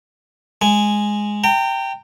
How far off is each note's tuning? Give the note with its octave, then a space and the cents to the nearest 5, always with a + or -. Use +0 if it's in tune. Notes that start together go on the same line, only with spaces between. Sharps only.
G#3 +0 G#5 +0
G5 +0 A#5 -35